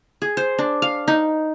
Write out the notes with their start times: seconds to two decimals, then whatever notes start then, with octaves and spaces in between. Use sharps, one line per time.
0.22 G#4
0.37 C5
0.59 D4
0.82 F5
1.08 D#4